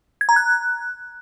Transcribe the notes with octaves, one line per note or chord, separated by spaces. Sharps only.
G#6
A#5
F#6